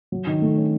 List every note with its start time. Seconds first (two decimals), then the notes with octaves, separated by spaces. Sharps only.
0.12 F#3
0.27 D#3
0.41 A3
0.57 C#4